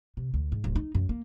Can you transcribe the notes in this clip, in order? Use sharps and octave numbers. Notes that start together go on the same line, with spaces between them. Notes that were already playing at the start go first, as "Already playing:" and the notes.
C3
D2
G#2
D1
D#4
F#2
A#3